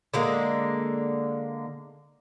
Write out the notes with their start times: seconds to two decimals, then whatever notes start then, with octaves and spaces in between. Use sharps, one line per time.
0.14 D3 G#3 A#3